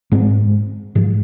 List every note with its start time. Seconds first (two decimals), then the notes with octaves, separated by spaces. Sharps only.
0.12 G#2 G#3 C4
0.95 G#2 F3 G#3